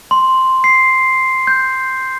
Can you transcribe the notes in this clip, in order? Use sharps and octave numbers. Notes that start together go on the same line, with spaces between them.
C6
C7
G6